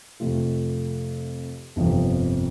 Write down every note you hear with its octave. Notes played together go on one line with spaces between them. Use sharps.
F2 C3 A3 F4
G1 F2 C3 F3 C4